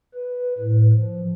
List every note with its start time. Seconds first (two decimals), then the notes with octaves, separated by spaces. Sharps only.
0.14 B4
0.58 A2
0.94 F3